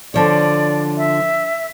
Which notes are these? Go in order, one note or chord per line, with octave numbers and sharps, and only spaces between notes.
D3 F3 C#5 D5
E5